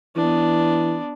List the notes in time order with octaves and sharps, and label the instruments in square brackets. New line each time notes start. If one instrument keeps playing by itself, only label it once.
[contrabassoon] E3 [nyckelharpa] B3 D4